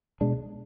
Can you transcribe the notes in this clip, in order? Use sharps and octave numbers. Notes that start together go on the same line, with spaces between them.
B2 G#3 D4